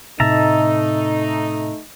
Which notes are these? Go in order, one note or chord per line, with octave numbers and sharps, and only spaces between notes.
A2 C3 A3 D#4 E5 A5 A#5